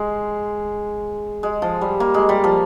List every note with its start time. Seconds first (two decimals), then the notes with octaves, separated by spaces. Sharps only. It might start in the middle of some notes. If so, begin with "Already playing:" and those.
Already playing: G#3
1.43 G#3
1.62 F3
1.81 G3
2.00 A#3
2.14 G#3
2.29 G3
2.44 F3